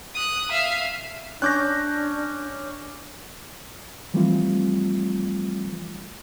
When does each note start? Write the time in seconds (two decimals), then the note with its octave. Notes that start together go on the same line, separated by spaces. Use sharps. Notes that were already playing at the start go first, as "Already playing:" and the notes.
0.15 D#6 F#6
0.52 E5 F5
1.42 C#4 D4 D6 F#6 G6 A#6
4.14 E3 F3 G3 A3 C4 F4